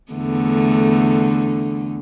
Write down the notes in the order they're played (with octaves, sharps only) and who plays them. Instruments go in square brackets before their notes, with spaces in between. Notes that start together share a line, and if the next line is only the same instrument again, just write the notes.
[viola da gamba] E2 D3 A3